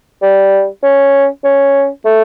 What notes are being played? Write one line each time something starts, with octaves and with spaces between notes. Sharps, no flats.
G3
C#4
C#4
A3